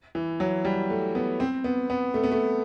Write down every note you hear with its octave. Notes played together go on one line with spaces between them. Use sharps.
E3
F#3
G3
A3
B3
C4
B3
B3
A3
B3
A3